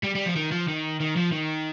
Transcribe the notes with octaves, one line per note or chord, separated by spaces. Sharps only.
G3
G3
F3
D#3
F3
D#3
D#3
F3
D#3